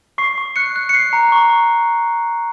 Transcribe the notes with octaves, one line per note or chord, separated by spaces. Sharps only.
C#6 C7
C#6
F#6 C#7
F#6
C#7
F#6 C7
A#5
C#6
C#6